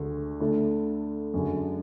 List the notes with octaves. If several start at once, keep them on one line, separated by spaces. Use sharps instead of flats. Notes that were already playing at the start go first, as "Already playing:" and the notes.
Already playing: D2 D3 G#3
D3 A3 E4 A4
F#2 D3 G#3